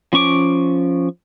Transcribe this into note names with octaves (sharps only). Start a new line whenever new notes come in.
F3 C#4 C#6 D6